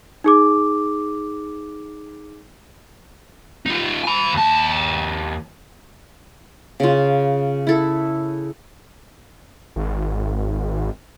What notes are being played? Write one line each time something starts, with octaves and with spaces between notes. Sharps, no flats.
D#4 G#4 D6
D#4 F4
G#5 B5
D#2 A5
C#3 F4
E4 A4
G#1